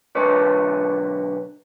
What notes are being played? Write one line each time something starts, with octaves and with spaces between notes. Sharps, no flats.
B1 D3 B4 C#5